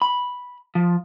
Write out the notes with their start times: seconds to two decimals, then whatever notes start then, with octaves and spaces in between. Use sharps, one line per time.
0.02 B5
0.75 F3